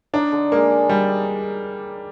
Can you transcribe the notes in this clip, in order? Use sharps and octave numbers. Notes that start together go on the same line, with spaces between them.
D4 D#4
D3
G#3 A#3
G#4
G3 G#3
G#4